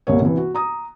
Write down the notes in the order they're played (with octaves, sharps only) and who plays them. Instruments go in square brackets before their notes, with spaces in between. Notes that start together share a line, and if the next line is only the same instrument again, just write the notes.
[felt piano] G1 C2 A#3 C#5
C3 E3
F#4
A#5 D#6